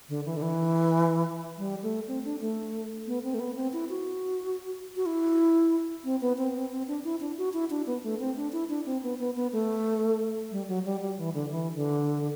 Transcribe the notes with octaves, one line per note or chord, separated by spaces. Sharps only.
D3
E3
D3
E3
G3
A3
C4
D4
A3
B3
C4
A3
B3
C4
E4
F#4
F#4
E4
C4
B3
C4
C4
C4
D4
E4
D4
F#4
E4
D4
B3
A3
C4
D4
E4
D4
C4
B3
B3
B3
A3
G3
F#3
G3
G3
E3
D3
E3
D3